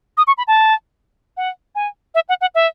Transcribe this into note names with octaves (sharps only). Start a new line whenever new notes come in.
D#6
C#6
B5
A5
F#5
G#5
E5
F#5
F#5
E5